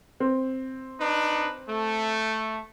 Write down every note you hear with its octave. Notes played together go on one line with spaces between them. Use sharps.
C4
D4 D#4 B4
A3